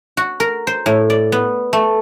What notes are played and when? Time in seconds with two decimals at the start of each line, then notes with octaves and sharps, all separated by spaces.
0.17 F#4
0.40 A#4
0.67 C5
0.86 A2
1.10 D5
1.32 B3
1.73 A3